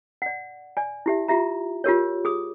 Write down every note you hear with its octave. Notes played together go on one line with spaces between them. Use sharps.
D5 F#5
D5 G#5
E4 G4 E5
F4 G4 E5 A#5
F4 G4 A#4 C#5
G#4 D#6